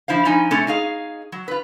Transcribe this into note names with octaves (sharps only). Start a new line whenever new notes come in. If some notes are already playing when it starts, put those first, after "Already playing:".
F3 E4 C5 F5
F3 C#4 D#4 G#5
C3 A3 C#4 F4 A4
D#4 G#4 F5
F#3
F4 B4